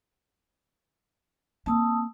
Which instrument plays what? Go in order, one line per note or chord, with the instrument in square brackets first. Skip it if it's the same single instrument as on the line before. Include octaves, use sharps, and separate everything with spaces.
[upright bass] A#3 C4 [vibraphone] A5 D#6 E6